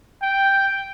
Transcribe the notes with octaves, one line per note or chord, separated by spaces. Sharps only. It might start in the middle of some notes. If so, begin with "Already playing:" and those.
G5